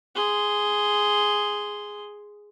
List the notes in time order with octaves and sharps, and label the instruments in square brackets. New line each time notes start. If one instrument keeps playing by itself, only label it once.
[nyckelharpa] G#4 C6